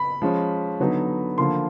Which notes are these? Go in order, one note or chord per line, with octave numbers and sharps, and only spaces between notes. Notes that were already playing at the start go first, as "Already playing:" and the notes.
Already playing: B5
F3 G#3 C#4
D3 F#3 B3 D#4
D3 F3 A#3 C6